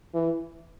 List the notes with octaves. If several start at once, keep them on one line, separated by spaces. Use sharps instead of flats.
E3